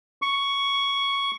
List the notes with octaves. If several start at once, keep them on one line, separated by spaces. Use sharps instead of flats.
C#6